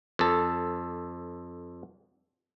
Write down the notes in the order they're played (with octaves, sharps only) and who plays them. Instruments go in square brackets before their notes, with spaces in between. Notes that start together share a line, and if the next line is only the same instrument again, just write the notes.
[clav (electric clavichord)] F2 A4